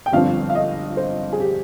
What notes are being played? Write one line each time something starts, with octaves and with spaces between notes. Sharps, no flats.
G5
G1 G2 F3 C4 F5
F5
D#5
C5
G#4
G4